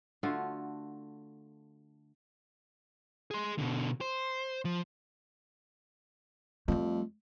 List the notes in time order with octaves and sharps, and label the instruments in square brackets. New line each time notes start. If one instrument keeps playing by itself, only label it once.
[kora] D3 A3 F4 F#4
[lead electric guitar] G#4 C6
B2 D3
C5
F3
[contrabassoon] F2 [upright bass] G3 A3